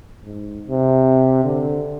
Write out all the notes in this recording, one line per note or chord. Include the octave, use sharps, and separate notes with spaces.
G#2
C3
D3